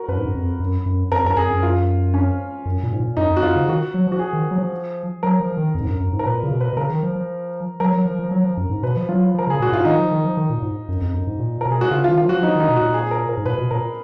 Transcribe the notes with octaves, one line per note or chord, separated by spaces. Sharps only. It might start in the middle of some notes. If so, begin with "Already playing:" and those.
Already playing: F#4 A#4
F#2 B4
G#2
F#2
F2
F#2
F#2
F2 A#4
F#2 A#4
F2 G#4
F#2
F4
C#4
F#2
A#2
G#2
A#2
F#2 D#4
F2
F#4
F2 F4
C#3
D#3 F#4
F#3
F3
F#4
G#4
D#3
F#3
F3
F#3 A#4
F3
D#3
F2
G#2
F#2
F#2
G#2
A#4
A#2 B4
C#3
B2
B4
B2
C#3 A#4
D#3
F3
F3
F#3 A#4
F#3
F3
F3
F#3
F3
F#2
G#2
B2 B4
F3
F#3 F4
F3
A#4
C#3 G#4
A#2 F#4
G#2 F4
D#3 D#4
F3
D#3
F3
D#3
A#2
G#2
F#2
F2
F#2
G#2
A#2
B2 A#4
G#4
F#4
C#3 F4
F4
D#3
F4
F3 F#4
F3 D#4
D#3
D#4
B2
A#2 F#4
G#4
A#4
A#4
G#2
A#2 B4
B2
A#2 A#4